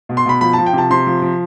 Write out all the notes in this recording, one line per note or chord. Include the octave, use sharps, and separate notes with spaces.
B2
C6
B2 B5
F3 B5
F3 A5
G5
C3 A5
C3 C6
F3
F3